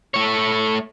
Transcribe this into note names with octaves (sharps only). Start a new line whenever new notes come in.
A3 C#5